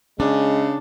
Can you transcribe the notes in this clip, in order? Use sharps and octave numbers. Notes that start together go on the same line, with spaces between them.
C#3 G#3 D4